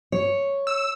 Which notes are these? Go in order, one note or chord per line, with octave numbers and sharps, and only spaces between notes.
C#5
E6